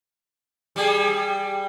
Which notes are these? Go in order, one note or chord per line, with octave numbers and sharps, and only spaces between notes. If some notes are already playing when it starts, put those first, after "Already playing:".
G3 G4 G#4